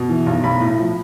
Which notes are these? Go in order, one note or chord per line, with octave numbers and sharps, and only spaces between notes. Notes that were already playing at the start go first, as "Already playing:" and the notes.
Already playing: B2
E3
B1
B1 B5
A2
F3